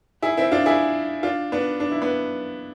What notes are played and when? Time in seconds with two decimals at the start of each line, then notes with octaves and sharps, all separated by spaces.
0.22 E4 G#4
0.37 C4 E4
0.51 D4 F4
0.66 E4 G#4
1.23 D4 F4
1.52 B3 D4
1.80 D4
1.92 E4
2.01 B3 D4